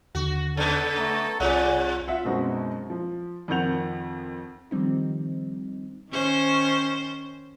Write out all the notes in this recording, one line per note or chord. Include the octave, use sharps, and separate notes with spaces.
D#2 D3 F#4
C#3 B3 A4
A3 A#5 C#6
C2 C3 F4 D5 F#5 G#5
F4 E5 F#5
F#2 B2 G#3 C4 D#4 F#4
F3
F2 D#3 F3 F#5 G6 F7
D#3 F3 G3 C4 D#4
D#3 C#4 C5